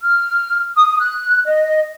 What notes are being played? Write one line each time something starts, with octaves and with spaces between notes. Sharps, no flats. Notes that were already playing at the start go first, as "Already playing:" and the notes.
F6
D#6
F#6
D#5